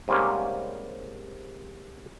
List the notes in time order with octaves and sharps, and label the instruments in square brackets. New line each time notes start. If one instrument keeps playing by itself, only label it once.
[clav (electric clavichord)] G#2 C3 G3 A#3 C#4